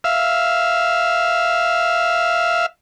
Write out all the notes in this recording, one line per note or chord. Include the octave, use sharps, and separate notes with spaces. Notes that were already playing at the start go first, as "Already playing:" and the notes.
E5 F5